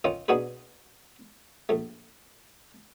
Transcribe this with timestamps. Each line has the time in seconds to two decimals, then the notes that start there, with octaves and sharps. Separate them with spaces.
0.04 D#3 C#4 D#4 F4
0.28 B2 D4 D#4 F#4 G#4 B4
1.69 A#1 A3